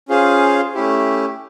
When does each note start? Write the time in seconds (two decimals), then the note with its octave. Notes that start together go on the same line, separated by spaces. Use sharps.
0.09 C#4 F4 G#4 C5 F5
0.74 A3 C#4 E4 G4